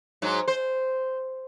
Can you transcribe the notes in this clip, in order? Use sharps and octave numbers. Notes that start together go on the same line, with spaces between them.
G#2 F#3
C5